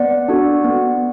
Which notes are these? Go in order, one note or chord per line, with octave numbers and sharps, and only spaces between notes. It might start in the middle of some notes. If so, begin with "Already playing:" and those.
Already playing: B3 D5 F#5
D4 F#4 A4
B3